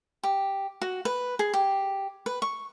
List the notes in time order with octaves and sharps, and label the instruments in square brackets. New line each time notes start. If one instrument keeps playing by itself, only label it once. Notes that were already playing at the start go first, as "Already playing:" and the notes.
[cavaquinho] G4
F#4
B4
G#4
G4
B4
C#6